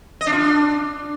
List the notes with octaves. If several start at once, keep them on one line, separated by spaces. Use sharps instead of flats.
D#5
D4
F4
D4